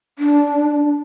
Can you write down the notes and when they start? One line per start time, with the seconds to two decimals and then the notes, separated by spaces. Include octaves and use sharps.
0.19 D4